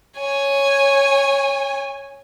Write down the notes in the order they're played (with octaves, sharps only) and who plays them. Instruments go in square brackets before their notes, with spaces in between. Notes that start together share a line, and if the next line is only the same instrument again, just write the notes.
[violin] C#5 G#5